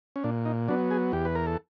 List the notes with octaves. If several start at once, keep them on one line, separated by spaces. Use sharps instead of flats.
C#4
A#2 D4
D#4
F#3 B3 D4
G#4
E2 G4
B4
A#4
A4